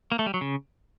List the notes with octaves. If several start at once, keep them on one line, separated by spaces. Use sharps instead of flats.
A#3
A3
G3
F#3
C#3